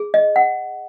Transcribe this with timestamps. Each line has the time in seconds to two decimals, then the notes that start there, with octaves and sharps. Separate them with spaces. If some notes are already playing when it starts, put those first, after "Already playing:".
Already playing: G#4
0.14 D#5
0.36 F#5